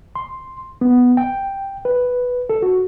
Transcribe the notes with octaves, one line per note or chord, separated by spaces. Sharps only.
C6
B3
G5
B4
A4
F#4